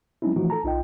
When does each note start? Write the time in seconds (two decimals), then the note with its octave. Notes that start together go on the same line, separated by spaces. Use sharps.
0.22 F#3 G#3 C4 C#4 D#4 E4
0.36 E3 F3 A3 D#4 F4 F#4
0.50 A4 A5 A#5
0.64 B1 D#4 F4 D#5 G5